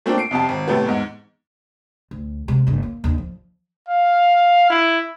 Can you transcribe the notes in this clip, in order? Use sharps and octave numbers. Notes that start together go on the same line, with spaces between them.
A3 A#3 C4 D4 F4 A4
C7 D7
C2 F2 C3 A5
G#1
A2 C3 A3 B3
E2 G#2
D2
C3 G#3
F#1 G2
A#3
D#2 D3
F3
F5
E4